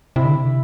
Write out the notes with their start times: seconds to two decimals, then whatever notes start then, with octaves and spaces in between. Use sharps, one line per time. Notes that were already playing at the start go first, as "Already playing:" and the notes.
0.16 C3 E4
0.25 D3
0.35 C3